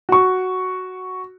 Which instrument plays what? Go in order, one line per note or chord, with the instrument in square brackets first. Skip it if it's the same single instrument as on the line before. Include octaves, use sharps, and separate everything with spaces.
[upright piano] F#4 C#6